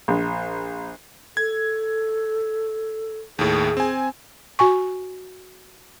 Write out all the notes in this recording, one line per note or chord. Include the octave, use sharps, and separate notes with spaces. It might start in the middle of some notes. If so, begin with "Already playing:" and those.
A#1
A4 G#6
D#2 A2 G#4
C4 G#5
F#4 G#5 C#6